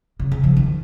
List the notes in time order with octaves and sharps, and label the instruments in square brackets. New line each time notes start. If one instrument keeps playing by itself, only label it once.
[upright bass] C#3
C#3
F3
D#3